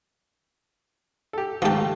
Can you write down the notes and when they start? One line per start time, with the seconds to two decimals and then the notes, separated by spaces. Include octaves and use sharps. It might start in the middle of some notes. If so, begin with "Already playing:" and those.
1.33 G4 A4
1.62 G#2 F3 A3 G4 A5